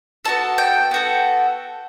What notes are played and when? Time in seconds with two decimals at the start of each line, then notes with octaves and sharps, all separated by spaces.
0.25 B3 F#4 A4 A5
0.58 G5
0.91 B3 F#4 A4